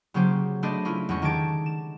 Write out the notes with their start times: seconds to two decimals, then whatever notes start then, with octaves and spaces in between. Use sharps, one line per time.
0.14 C#3 F#3 A#3 C#4 G4 C5
0.63 A3 D4 B4 C5 D5 D#5
0.85 C#4 E4 F4
1.09 E2 G#3 C#4 C#6
1.22 D#3 G4 A5 G#6 D7
1.66 E7